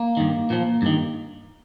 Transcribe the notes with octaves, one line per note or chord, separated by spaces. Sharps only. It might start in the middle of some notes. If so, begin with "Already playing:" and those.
Already playing: A#3
G2 D#3
A#2 F3
G2 D#3